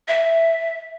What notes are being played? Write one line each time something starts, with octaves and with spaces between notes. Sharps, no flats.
E5